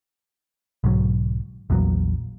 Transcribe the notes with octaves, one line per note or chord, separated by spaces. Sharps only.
B1 G#2 D3 F#3
A#1 E2 A#2 F#3